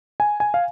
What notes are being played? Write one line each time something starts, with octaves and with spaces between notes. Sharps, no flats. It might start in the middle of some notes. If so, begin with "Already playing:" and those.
G#5
G#5
F5